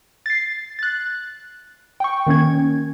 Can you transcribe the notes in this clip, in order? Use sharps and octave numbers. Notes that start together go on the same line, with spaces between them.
A6 C7
F#6 A6
G5 C#6
D#3 A#3 C#4 G#6